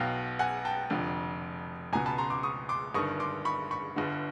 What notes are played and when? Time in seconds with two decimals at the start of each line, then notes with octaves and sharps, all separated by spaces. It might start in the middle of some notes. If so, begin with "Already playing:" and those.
Already playing: B1 B2 F5 G5
0.39 F#5 G#5
0.65 G5 A5
0.90 F1 F2 D3
1.93 C#2 B2 G#5 A#5
2.06 A5 B5
2.18 A#5 C6
2.30 C6 D6
2.43 C#6 D#6
2.69 C6 D6
2.94 G1 G2 D#3 C#6 D#6
3.20 C6 D6
3.45 B5 C#6
3.71 B5 C#6
3.96 G1 G2 D3